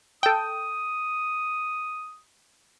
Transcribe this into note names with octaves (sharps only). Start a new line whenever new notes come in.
A4 G5 D#6